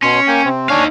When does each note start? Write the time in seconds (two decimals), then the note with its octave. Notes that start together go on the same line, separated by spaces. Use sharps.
0.03 B2 C#4 C6
0.28 A#3 G5 G#5
0.45 C3 C4
0.70 D4 D#4 C#5 F5 G#5